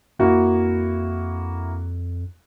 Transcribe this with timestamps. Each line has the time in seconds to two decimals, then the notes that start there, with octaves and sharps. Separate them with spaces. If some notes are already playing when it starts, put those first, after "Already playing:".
0.19 F2 A#3 E4 F#4